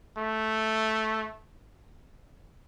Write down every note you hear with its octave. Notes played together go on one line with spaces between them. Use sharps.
A3